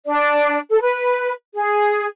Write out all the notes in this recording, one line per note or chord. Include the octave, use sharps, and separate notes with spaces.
D4 D5
A4
B4
G#4